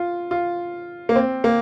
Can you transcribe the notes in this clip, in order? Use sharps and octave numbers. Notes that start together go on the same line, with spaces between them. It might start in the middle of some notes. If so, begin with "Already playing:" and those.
Already playing: F4
F4
A#3
C4
A#3